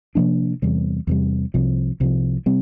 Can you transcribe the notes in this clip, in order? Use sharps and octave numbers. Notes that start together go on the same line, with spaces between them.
C3 F3 A#3 D4
E2 C3 G3
E2 C3 G3
C2 C3 F3
C2 C3 F3
C3 G3 C4